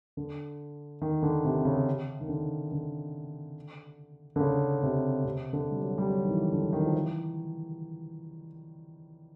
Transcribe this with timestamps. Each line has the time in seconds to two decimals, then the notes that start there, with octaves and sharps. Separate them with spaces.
0.17 D3
1.02 D#3
1.23 D3
1.45 C3
1.65 C#3
2.21 D#3
2.28 D3
2.72 D3
4.36 D3
4.40 C#3
4.83 C3
5.25 C3
5.53 D3
5.71 G3
5.81 F#3
5.98 G3
6.10 F#3
6.25 D#3
6.31 E3
6.52 D3
6.73 D#3
6.86 F3
6.94 E3